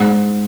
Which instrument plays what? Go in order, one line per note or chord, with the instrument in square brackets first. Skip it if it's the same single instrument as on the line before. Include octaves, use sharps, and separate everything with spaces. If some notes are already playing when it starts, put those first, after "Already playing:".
Already playing: [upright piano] G#2